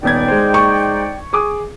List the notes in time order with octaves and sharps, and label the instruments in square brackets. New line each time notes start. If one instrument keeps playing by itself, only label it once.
[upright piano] D#1 B3 G#6 [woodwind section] D#4 D5 G5
[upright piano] G#3 C5
[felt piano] C#6
[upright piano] G#4 D6 D#6